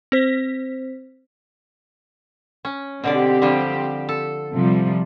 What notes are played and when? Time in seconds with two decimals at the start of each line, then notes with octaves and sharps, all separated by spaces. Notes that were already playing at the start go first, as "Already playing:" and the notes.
0.12 C4 C5 B6
2.65 C#4
3.04 B2 D3 C4 G4 D5
3.42 D3 F3 G3
4.09 A4
4.53 C3 F3 G3